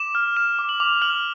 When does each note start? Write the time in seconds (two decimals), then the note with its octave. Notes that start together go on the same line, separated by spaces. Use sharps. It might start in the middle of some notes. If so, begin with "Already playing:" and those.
Already playing: D6 E7
0.15 F6
0.37 F6 E7
0.59 D6
0.69 F#7
0.80 D6 F7
1.02 F6 F#7